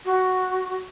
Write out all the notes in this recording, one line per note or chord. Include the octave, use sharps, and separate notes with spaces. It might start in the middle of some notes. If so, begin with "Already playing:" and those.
F#4